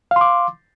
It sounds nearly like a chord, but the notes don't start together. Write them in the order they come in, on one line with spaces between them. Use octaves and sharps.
F5 C6 D6